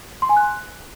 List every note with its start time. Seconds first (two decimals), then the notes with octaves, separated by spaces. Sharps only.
0.22 C6
0.29 G#5
0.37 F#6